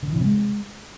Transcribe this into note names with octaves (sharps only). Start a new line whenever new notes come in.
D3
E3
C3
G#3